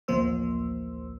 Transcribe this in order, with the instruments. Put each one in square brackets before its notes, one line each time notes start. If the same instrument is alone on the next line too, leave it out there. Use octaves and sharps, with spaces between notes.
[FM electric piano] A1 D2 F3 A#3 C5 E6